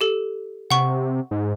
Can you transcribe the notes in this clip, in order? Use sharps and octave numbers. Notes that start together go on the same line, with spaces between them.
G4 A4
C3 F#5 C#6
G#2